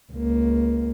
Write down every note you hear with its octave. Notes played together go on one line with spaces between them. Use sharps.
C#2 A#3